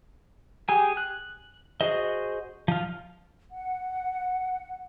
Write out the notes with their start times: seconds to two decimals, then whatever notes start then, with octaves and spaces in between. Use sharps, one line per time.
0.69 G4 G#4 G#5
0.97 F#6
1.81 F#4 G#4 C5 D#5
2.68 F3 F4
3.51 F#5